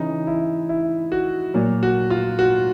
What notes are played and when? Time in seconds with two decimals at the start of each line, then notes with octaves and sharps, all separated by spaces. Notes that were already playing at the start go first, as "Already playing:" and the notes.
Already playing: C#3 E3 D#4
0.27 E4
0.69 E4
1.12 F#4
1.54 A#2 F#3
1.83 F#4
2.10 F4
2.39 F#4